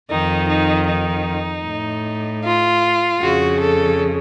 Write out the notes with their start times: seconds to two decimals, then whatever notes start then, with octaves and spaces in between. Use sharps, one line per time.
0.10 F2 D#3 D#4
0.48 D#4
0.87 D#4
1.65 A2
2.43 F4
3.20 F2 C#3 F#4
3.59 A4